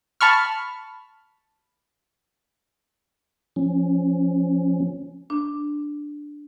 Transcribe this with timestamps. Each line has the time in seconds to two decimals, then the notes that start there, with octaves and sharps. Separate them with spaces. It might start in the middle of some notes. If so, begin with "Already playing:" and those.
0.21 A5 B5 C#6 F6
3.56 F3 C#4
5.30 D4